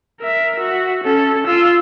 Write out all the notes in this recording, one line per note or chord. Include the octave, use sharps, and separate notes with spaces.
A#4 E5
F#4 E5
C#4 A4
F4 E6